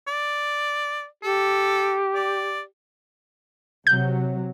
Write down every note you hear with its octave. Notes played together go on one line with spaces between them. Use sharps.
D5
G4 A4
D5
C3 F#3 G6